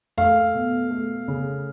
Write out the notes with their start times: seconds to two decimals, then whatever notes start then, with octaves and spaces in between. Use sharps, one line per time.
0.18 A3 F5
0.55 B2
0.91 A3
1.28 C#3